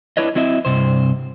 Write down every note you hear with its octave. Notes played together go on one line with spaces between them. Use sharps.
D4 E4 B4 C#5 D#5
F#3 C4 E4 D#5 E5
G2 C3 C5